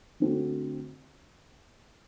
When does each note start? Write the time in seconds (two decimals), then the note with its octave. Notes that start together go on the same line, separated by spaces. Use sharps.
0.20 D3 A3 C4 F#4